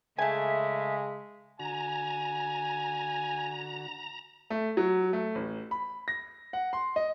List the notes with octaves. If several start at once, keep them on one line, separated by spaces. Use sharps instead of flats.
C#3 G#3 A3 E5 G#5
D3 F#4 G#5 A#5
A3
F#3
A3
A1
B5
A#6
F#5
C6
D#5